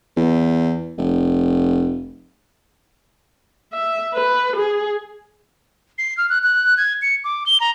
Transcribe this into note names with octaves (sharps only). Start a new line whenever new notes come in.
E2
F1
E5
B4
G#4
C7
F6
F#6
F#6
G#6
C#7
D6
G7
A#5